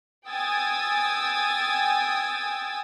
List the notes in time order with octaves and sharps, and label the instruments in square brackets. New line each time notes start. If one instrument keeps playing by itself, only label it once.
[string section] G5 G#5 D#6 E6 G#6 A6